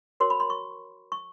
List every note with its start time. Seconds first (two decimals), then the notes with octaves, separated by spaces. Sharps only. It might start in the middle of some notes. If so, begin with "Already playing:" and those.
0.20 F#4 A#4 C#5 C6
0.30 B5
0.40 C6
0.50 C#6
1.12 C#6